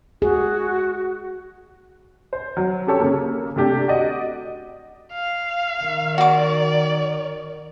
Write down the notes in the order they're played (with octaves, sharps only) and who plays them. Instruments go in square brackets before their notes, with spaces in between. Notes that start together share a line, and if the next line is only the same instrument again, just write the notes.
[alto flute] F#4 [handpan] G#4
[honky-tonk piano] C5
F#3
C#4 G4 A4 C#5
C#3 A#3
C3 A3 D4 G4
F#4 D5 D#5 F#5
[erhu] F5
[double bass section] D#3
[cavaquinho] F#4 D6 [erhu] D5